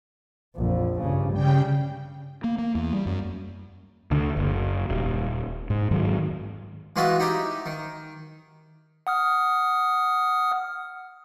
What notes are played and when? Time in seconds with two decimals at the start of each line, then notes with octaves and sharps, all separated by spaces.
0.56 A#1 F2
1.01 G2 C#3
1.33 C#3 G3 G5
2.44 A#3
2.58 A#3
2.75 E2
2.93 G3
3.06 F#2
4.11 D2 D3
4.37 F#1
4.89 D#1
5.70 G#2
5.91 G#2 D#3 F#3
6.96 E3 G#3 F4 F#4 D#5 E5
7.19 D#4 E4 G4 D#5
7.66 D#3
9.07 F#5 D#6 F6